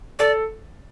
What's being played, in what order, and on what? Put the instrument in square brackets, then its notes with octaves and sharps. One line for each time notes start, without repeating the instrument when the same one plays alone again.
[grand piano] A4 [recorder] D5